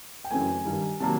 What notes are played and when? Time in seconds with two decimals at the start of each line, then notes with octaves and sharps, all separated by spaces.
0.24 G5
0.31 F#2 C#3 E3 A3 G#5
0.65 G2 D#3 G3
1.00 C3 D#3 F#3 A#3 A5